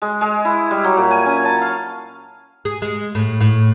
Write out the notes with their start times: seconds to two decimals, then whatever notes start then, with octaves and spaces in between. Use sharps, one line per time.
0.02 G#3
0.21 G#3
0.45 E4
0.71 G3
0.84 F#3
0.97 A#2
1.11 G#5
1.26 C#4
1.45 A5
1.62 F5
2.65 G#4
2.82 G#3
3.15 A2
3.41 A2